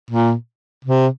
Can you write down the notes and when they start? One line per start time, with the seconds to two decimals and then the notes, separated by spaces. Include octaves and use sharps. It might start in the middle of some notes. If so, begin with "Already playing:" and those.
0.11 A#2
0.85 C3